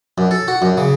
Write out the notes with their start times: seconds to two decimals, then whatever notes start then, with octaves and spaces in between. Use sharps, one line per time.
0.18 F#2
0.31 A4
0.48 F#4
0.62 F#2
0.78 C#3